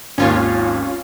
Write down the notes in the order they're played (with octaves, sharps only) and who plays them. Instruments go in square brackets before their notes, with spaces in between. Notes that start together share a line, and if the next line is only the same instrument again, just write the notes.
[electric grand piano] G#1 D#2 [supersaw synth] C#4 F4 C#5